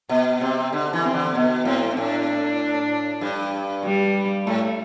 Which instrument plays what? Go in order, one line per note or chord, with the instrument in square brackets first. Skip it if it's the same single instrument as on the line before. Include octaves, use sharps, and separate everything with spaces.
[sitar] B2 [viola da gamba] B3
[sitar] C3 [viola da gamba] C4
[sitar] D3
E3
[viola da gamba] C4
[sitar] D3
[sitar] B2 [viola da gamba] B3
[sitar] A2 [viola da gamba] C4
[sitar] A2 [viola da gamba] D4
[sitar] G2
[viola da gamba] G3
[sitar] A2 [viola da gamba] A3